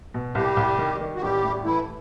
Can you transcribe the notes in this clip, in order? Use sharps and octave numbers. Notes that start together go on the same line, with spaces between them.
B2
C2 G3 G4
C2
D#3
D#3
F#4
A1 G3 G4
A2
E3 A3 E4